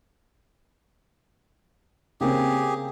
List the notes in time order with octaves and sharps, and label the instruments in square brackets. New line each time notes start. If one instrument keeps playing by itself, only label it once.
[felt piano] C#3 A#3 C4 [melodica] G4 G#4